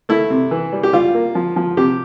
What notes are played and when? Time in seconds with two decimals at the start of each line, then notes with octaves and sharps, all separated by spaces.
0.09 A3 E4
0.30 C3
0.51 E3
0.72 G3
0.83 G4
0.93 G3 F4
1.14 A#3
1.35 F3
1.56 F3
1.77 C3 G4